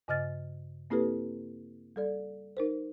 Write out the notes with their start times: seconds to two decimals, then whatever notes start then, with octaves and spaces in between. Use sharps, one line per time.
0.08 G2 C#3 D#5 F6 A6
0.90 A#3 C4 E4 G4 A4 B4
1.96 G3 A4 D5
2.57 D#4 A#4 C5